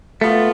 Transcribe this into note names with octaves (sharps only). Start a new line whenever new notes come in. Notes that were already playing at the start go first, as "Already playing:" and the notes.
B2 A3 B3 F4